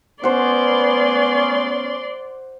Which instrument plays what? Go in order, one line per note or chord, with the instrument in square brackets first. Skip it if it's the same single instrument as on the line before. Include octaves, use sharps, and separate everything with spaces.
[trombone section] B3 C#4 [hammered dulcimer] C5 F#5 [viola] D5 C6